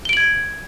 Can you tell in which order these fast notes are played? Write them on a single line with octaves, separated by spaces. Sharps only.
G7 D7 F#7 G#6